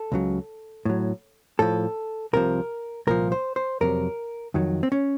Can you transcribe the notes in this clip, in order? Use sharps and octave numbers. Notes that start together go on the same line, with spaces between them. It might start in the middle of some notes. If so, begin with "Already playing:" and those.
Already playing: A4
C#2 C#3 F#3
A2 F#3
A2 F3 A4
C2 C3 F3 A#4
C2 A#2 F3 A#4
C5
C5
F2 C3 F#3 A#4
F2 D#3 F#3
C4
C#4